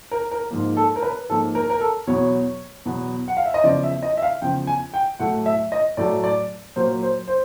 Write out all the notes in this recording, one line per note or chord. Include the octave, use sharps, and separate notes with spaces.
A#4
A#4
G#2 F3 A#3
A4
A#4
B4
G#2 F3 A#3 A4
A#4
A#4
A4
E2 B2 F#3 B3 C#5
E2 B2 F#3 B3
F#5
F5
E5
D#5
E2 C#3 F3 D5
E5
D#5
E5
F5
E2 C#3 F3 G5
G#5
G5
A2 F#3 A3 F#5
E5
D#5
A2 F#3 A3 D5
D5
A#2 F#3 A#3 C5
C5
C5